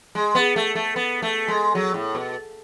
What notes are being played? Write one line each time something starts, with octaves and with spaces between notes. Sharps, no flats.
G#3
B3
A3
A3
B3
A3
G#3
F#3
A2
B2